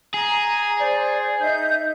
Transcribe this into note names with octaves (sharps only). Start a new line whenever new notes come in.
G#4 A#5
C5 D5
D#4 E5 G6